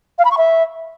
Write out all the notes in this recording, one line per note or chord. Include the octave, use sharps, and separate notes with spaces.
F5
B5
C#6
E5